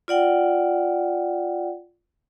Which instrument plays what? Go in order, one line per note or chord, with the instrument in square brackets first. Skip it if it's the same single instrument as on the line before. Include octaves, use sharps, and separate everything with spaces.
[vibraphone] F4 D5 F#5 G5